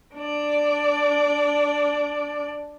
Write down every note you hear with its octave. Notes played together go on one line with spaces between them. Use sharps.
D4 D5